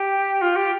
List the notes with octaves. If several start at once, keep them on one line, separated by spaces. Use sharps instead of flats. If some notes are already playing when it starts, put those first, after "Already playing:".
Already playing: G4
F4
G4